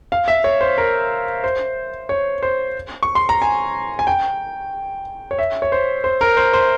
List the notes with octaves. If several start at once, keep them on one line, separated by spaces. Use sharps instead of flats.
F5
E5
C#5
C5
A#4
C5
C#5
C5
C#6
C6
A#5
G#5
G#5
G5
C#5
E5
C#5
C5
C5
A#4
C5
C5